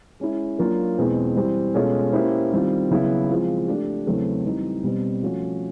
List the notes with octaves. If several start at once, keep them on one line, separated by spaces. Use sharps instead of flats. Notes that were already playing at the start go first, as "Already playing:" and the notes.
G#3 C#4 E4
F#3 A#3 D4 F4 A#4
E2 B2 G#3 C4
E3 G3 C4
B2 G#3 C#4 F4 A4
A#3 C#4 E4 G4 C5
D#3 G3 C4 F4
C#3 F#3 B3 E4
F3 G#3 C4 F4
A3 D4 G4
E2 C#3 F#3 A3 C4
E3 G3 C4 D#4
B2 G3 C4
F3 A3 C#4 F#4